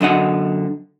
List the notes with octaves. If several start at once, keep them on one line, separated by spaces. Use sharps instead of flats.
F#2 D3 D#5 F#5